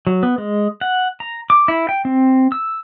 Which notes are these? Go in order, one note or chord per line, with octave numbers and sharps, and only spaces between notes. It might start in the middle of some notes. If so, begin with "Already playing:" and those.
F#3
B3
G#3
F#5
A#5
D6
E4
G5
C4
E6